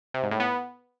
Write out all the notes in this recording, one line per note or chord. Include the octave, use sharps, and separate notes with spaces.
C3
G#2
A2
B3